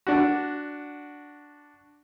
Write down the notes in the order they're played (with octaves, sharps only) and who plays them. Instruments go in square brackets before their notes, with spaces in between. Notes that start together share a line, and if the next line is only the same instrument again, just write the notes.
[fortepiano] D4 F#4